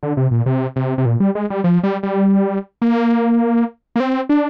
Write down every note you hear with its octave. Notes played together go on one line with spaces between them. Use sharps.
D3
C3
A#2
C3
C3
C3
A#2
G3
G#3
G3
F3
G3
G3
A#3
A#3
C4
D4